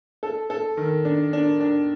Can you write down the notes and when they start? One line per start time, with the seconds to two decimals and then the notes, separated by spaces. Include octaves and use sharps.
0.23 A4
0.50 A4
0.77 D#3
1.05 D4
1.33 D4
1.60 D4